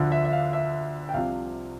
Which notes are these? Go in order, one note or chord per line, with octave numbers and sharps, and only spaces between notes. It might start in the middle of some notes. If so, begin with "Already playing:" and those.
Already playing: D2 D3 F3
E5
E5
F5
E5
G5
C2 C3 F3 F5